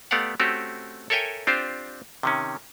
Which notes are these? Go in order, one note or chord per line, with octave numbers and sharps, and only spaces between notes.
A3 B3 G4 D5 F5 F#5
A3 C4 C#4 F#4 G4
A4 A#4 C#5 E5 G5 G#5
C4 D4 F4 G4 C5
C3 D#3 C#4